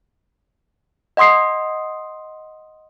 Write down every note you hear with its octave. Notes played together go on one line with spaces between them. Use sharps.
D#5 F#5 C6 D#6 C7